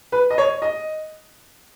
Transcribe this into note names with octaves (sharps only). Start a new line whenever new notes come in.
B4
D#5
C#5
D#5